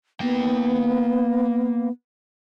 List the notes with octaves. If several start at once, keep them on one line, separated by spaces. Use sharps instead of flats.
A#3 B3 G5